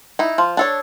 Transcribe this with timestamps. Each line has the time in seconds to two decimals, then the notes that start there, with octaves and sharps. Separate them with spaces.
0.19 D#4 E4
0.38 F3
0.57 D4 A4 C#5